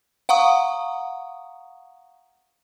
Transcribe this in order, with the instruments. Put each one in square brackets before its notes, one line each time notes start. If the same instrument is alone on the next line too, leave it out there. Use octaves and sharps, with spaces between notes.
[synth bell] F5 F#5 A#5 C#6 D#6